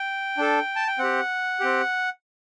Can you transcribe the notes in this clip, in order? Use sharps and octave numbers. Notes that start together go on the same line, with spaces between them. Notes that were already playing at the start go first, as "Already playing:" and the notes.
Already playing: G5
D4 A4
A5
G5
C4 G4 F#5
C4 G4